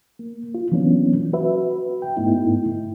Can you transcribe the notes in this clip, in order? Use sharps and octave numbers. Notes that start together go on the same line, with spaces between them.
A#3
F4
E3 F#3 A#3 B3 C#4 D4
F#4 B4 E5
G5
G#2 A3 B3 D#4 E4